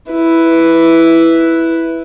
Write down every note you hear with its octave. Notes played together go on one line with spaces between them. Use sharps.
E4 B4